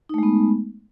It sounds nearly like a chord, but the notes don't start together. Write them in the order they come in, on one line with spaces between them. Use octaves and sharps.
D#4 A3 G#3 B3